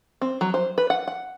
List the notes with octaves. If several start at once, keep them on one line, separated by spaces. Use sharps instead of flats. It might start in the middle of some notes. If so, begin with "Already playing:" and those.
C4
F#3
C5
B4
F#5
F#5